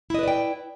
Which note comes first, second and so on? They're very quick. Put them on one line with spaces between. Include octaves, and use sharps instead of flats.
E4 D#5 B4 D5 G5